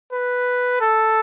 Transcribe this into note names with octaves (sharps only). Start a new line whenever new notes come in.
B4
A4